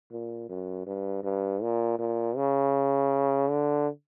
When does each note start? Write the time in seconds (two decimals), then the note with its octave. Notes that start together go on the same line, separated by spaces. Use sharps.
0.12 A#2
0.49 F#2
0.86 G2
1.24 G2
1.62 A#2
1.99 A#2
2.37 C#3
3.48 D3